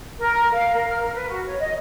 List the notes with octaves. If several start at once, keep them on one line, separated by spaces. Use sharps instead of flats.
A#4
F5
A#4
F6
A#4
B4
F#4
C#5
D#5